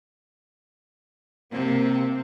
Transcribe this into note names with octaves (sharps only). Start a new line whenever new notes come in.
C3 A#3 C4